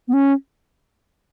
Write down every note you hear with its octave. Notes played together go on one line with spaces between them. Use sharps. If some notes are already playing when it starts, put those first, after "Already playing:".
B3
C#4